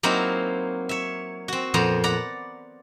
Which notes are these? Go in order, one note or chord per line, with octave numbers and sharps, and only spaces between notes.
F#3 A#3 C4 D#4 E4
C#5 E5
C4 F#4
F2 A#2 B3 C5 A#5
D5 F#5 A#5 B5